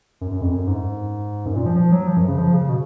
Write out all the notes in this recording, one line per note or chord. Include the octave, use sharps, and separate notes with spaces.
F#2
F#2
F2
F#2
G#2
F#2
A#2
F3
F3
F#3
F3
F#2
C#3
F3
C#3
B2